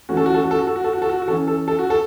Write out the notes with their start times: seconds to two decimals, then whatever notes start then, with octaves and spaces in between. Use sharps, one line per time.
0.09 E3 A3 C#4 F#4
0.17 A4
0.26 F#4
0.35 A4
0.43 F#4
0.51 A4
0.59 F#4
0.67 A4
0.76 F#4
0.84 A4
0.93 F#4
1.02 A4
1.09 F#4
1.22 F#4
1.28 E3 C#4 A4
1.48 A4
1.68 A4
1.79 F#4
1.90 A4